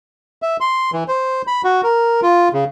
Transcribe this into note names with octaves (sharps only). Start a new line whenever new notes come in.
E5
C6
E3
C5
B5
F#4
A#4
F4
C#3